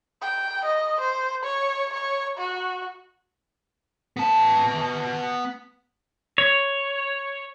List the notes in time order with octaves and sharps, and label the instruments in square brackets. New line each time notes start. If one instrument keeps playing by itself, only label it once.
[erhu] G5
D#5
C5
C#5
C#5
F#4
[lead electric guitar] B3 A5
[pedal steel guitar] C#5